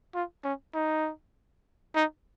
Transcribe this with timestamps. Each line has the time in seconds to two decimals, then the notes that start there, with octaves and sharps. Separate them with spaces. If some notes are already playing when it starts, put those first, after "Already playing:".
0.14 F4
0.44 C#4
0.74 D#4
1.95 D#4